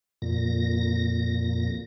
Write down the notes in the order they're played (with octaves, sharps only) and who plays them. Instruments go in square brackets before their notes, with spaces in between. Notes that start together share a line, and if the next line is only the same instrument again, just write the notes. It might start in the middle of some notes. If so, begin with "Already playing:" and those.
[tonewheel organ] F2 A#2 A#6